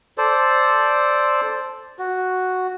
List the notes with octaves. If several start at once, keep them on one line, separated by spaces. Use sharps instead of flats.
A4 C5 D5
F#4